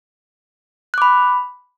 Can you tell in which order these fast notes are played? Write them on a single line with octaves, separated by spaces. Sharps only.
F#6 D6 B5